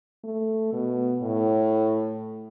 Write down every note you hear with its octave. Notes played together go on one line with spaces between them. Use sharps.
A3
B2
A2